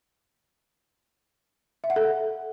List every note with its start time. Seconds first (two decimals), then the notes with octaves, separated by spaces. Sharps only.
1.84 E5
1.90 F#5
1.96 A4